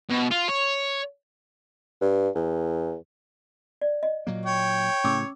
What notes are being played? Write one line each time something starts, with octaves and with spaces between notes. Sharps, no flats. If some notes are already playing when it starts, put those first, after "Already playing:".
B2
F4
C#5
G2
E2
D5
D#5
A#2 F#3 A#3
C#5 G5
A2 C#3 C#4 D6 E6